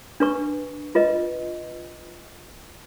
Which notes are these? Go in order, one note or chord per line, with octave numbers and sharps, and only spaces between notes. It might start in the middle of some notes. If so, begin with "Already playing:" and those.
D4 B4 C#6
F4 B4 D#5